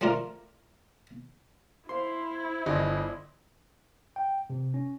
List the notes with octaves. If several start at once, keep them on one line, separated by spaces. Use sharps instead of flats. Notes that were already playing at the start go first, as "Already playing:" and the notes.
A3 C4 D4 F4 A#4
E4 C5 F5 C6
G1 D5 D#5 C6
G5
C3
C#4